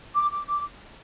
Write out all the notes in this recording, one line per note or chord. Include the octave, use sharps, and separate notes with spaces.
D6
D6
D6